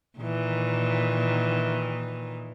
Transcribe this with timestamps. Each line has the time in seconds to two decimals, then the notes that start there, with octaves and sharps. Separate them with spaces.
0.19 A#2 D#3 E3